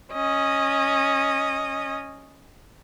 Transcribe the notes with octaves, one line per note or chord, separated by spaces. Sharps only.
C#4 D#5